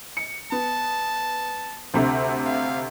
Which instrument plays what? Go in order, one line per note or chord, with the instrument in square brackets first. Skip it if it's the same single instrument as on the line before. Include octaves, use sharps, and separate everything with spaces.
[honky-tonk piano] C#7
[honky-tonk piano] B3 [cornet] A5
[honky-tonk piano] D2 C3
[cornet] F5